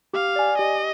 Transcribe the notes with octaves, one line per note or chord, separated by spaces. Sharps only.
G4 F5
D5 G#5
G4 D#5